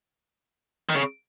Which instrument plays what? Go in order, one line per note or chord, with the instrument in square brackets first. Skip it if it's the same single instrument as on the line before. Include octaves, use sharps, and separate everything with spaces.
[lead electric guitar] D#3
C#3